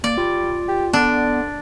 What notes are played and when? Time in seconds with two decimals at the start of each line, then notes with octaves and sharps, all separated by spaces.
0.04 A#3 D5
0.17 G3 F4
0.68 G4
0.93 D3 B3 D4